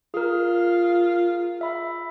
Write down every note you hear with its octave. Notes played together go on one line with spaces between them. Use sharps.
F4 G#4 A#4
E5 B5